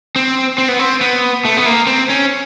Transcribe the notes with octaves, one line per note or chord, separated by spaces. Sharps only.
C4
C4
B3
C4
B3
A3
B3
A#3
C4
C#4